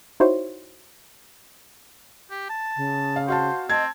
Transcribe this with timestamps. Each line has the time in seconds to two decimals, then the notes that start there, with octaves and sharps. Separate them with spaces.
0.20 D#4 E4 F#4 C5 C#5
2.31 G4
2.50 A5
2.76 C#3
3.16 F5
3.28 F#4 C5 F5 A5
3.70 C4 D#5 A5 G#6